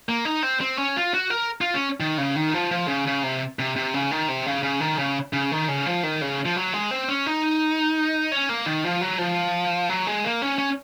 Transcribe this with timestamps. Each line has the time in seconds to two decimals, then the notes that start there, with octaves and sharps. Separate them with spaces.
0.09 A#3
0.25 D#4
0.43 C4
0.61 C4
0.78 C#4
0.96 F4
1.14 F#4
1.30 A#4
1.61 F4
1.74 C#4
2.00 D#3
2.18 C#3
2.36 D#3
2.54 F3
2.71 F3
2.88 C#3
3.07 C#3
3.23 C3
3.59 C3
3.76 C3
3.94 C#3
4.11 D#3
4.28 C3
4.46 C#3
4.63 C#3
4.80 D#3
4.99 C#3
5.33 C#3
5.52 D#3
5.68 C#3
5.86 F3
6.03 D#3
6.21 C#3
6.45 F3
6.56 F#3
6.73 G#3
6.91 C4
7.08 C#4
7.26 D#4
8.32 C#4
8.49 A#3
8.66 D#3
8.84 F3
9.01 F#3
9.18 F3
9.89 F#3
10.07 G#3
10.24 A#3
10.42 C#4
10.58 C#4